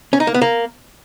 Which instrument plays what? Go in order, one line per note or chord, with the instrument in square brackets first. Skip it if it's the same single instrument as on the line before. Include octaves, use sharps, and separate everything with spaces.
[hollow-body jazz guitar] C#4
D#4
A#3
B3
A#3